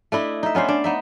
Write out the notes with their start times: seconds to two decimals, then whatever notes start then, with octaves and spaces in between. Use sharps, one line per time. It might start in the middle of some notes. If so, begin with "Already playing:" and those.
0.12 A3 D4 E4 D#5
0.43 D#4 E5
0.55 B3 C#4 D4 C5
0.69 D4
0.84 B3 D#4 E5